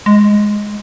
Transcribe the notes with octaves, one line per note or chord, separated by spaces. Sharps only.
G#3